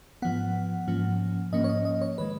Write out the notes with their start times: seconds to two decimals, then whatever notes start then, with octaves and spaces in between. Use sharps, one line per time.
0.22 G#2 F3 B3 F#5
0.87 G#2 F3 A#3 C#4
1.52 G#2 F3 A#3 C#4 D#5
1.64 C#5
1.69 D#5
1.85 D#5
2.01 C#5
2.18 D#3 G#3 B4